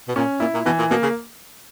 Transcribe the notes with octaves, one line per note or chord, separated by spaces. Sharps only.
B2
A#2 C#4
A#2 E4
A#2
B2 E3
A#2
B2 A#3
C#3